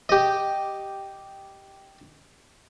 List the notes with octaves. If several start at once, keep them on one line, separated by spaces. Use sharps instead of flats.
G4 D#5